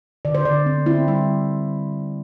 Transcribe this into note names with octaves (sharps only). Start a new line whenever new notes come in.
D3 D5
C5
D3 D5
C4
C4 E4
G3 E4